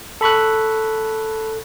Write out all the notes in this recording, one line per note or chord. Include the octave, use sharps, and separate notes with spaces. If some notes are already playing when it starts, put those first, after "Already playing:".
A4 B5 C#6 F#6